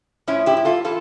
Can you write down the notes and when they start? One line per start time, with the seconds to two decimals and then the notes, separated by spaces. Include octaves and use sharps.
0.27 A2 F3 C#4 E4
0.46 E4 G4
0.57 G4
0.65 F4 A4
0.85 E3 F4 A4